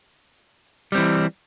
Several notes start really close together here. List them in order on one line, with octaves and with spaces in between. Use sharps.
G3 C4 E3